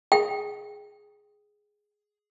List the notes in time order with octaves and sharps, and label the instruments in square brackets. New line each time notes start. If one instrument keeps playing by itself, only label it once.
[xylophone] G#4 [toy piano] G5